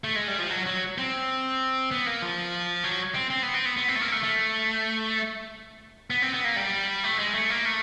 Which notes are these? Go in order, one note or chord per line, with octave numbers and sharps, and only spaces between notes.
A3
G#3
G3
F3
F#3
F#3
C4
B3
A#3
F3
F#3
C4
C4
B3
C4
B3
B3
C4
A3
A#3
A3
A3
B3
C4
B3
A#3
G3
A3
G#3
A3
A#3
A3